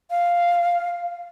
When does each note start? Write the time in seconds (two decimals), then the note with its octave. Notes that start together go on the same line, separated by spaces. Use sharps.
0.10 F5